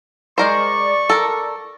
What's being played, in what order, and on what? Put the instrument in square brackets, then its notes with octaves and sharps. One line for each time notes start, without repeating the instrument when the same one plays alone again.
[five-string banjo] G#3 A#4 C5 [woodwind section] D5 C#6
[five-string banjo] A4 A#4